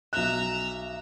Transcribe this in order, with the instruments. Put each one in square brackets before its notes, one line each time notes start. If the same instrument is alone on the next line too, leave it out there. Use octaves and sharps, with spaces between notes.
[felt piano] B1 F#6 [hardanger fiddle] E5 A#5